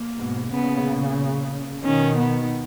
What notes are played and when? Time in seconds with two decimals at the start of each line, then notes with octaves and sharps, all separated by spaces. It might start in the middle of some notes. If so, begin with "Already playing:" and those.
Already playing: A#3
0.17 G#2 B2
0.50 A#2 C#3 B3
1.83 B2 D#3 C#4
2.17 B3